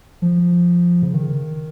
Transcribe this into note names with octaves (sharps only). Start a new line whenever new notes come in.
F3
C#3
D#3